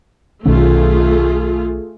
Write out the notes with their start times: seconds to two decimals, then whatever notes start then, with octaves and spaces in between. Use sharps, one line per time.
0.46 B1 D#3 A3 C#4 F4 G#4